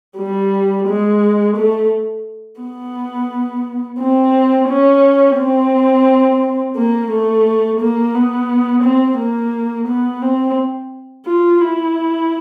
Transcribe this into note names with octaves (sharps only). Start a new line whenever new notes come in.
G3
G#3
A3
B3
C4
C#4
C4
A#3
A3
A#3
B3
C4
A#3
B3
C4
F4
E4